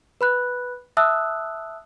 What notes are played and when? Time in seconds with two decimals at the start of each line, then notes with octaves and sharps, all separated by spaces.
0.21 B4 B5 F#6
0.97 E5 A5 D#6 E6 F#6